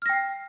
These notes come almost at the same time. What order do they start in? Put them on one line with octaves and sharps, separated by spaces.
F6 A#6 G5 C7